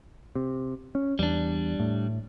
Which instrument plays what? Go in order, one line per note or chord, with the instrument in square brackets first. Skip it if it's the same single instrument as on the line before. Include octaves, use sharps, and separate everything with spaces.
[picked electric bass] C3
C#4
[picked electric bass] E2 [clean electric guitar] G3 D4
[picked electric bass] A2